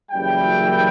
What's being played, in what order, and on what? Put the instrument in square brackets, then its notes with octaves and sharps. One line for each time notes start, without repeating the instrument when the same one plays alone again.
[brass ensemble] F#1 F#2 E3 G3 G5